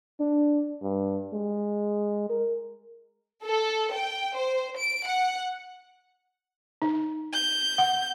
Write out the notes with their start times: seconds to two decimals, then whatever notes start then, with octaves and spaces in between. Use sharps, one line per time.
0.20 D4
0.83 G2
1.33 G#3
2.30 A#4
3.43 A4
3.94 G5
4.35 C5
4.77 D7
5.06 F#5
6.82 D#4
7.33 G6
7.78 F#5